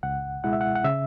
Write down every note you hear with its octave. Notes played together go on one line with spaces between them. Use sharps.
C#2 F#5
B2 G#3 E4 F#5
E5
F#5
F#5
C#3 E5